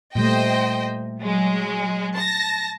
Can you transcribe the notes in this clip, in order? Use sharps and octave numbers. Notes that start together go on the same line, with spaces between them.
A#2 G3 A3 C5 D#5 G5
F#3 G#3
A5 A#6